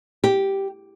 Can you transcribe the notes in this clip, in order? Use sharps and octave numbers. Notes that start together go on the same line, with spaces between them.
G4